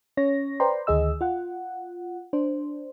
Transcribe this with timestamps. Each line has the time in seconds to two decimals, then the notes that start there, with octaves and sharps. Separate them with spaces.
0.17 C#4 C#5 A#6
0.60 B4 C5 D5 G5 A#5 C6
0.87 D2 D#3 G#4 D#5 E6
1.21 F4 F#5
2.33 D4 C5